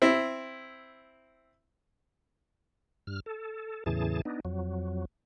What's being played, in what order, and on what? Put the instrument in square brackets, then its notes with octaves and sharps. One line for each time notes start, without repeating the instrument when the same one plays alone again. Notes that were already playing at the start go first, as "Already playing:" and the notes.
[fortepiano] C4 E4
[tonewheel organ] G2 F6
A4
E2 A2 C#3 E3 G#4 A5
B3 D4 D#4
F2 F#3